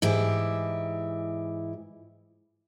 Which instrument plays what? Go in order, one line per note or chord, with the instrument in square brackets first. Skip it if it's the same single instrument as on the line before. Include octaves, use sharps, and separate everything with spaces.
[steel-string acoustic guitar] G#2 E3 E4 G4